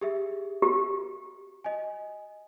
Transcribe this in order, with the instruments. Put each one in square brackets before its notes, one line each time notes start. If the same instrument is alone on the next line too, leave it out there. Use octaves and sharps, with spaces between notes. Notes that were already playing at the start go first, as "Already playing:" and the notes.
[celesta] G4 G#4 E5
[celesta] F#4 [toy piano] G4
[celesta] D#5 G#5